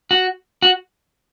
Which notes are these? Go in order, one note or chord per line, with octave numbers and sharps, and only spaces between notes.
F#4
F#4